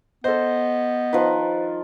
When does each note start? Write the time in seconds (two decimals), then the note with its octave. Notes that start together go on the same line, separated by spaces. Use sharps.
0.24 B3 A4 C5 D#5
1.13 D#3 F3 B4